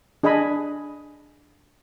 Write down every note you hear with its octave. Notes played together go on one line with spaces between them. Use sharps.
D4 G#4 D#5 G#5 B5